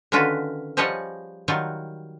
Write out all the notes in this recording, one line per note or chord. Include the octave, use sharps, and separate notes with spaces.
D3 D#3 C#4 F4 F#4 B4
F3 G3 G#4 C#5 D#5 F#5
D#3 F#3 G3 F4 F#5 G#5